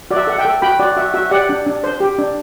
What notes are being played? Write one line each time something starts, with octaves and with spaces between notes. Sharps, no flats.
F#4 D5
E5
A4 F#5
E5 G5
A4
F#4 G5 B5
F#4 D5
F#4 E5
F#4 E5
G4 D5 F#5
D4
D4
C5
G4
D4